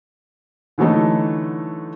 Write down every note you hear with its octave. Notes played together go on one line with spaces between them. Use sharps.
D3 E3 F#3 A3 D#4